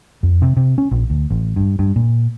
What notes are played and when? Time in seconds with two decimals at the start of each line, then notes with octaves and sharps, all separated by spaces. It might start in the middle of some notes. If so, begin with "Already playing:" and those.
0.23 F2
0.42 C3
0.57 C3
0.78 C#4
0.91 A#1
1.10 D2
1.30 A1
1.56 G2
1.79 G2
1.96 A#2